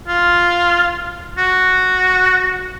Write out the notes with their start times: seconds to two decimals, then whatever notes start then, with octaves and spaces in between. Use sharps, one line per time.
0.08 F4
1.38 F#4